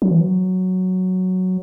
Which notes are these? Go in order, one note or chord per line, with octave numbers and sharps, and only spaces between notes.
F#3
E3
F#3